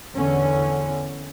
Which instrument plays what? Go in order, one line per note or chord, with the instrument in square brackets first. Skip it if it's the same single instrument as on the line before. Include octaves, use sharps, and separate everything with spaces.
[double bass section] E2 D3 C#4